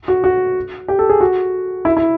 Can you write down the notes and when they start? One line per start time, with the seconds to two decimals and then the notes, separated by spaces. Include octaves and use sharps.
0.08 F#4
0.24 F#4
0.88 G4
0.99 A4
1.09 G#4
1.20 F#4
1.85 E4
1.97 E4